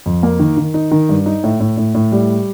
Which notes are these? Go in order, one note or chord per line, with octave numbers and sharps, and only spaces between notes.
F2
A#3
D#3
D#3
D#4
D#3
G2
D#4
A2
A2
A2
A2
G3